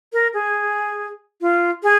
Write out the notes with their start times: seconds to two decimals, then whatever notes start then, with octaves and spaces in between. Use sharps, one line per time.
0.13 A#4
0.34 G#4
1.41 F4
1.83 G#4